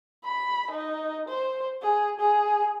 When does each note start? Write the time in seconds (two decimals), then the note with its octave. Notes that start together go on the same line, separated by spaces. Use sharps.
0.24 B5
0.71 D#4
1.28 C5
1.82 G#4
2.20 G#4